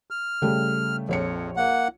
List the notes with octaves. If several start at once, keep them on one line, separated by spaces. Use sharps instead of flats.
F6
C#3 G3 A3
A#1 F2 C#5 C#7
A#3 F#5